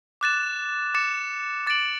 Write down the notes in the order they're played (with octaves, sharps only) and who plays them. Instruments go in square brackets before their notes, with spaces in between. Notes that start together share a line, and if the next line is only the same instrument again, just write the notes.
[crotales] D6 F#6 A6 E7
D6 A6 C#7 E7
D6 A6 D7 F#7